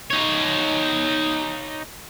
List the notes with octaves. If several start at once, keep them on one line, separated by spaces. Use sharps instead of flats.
D#4 C#5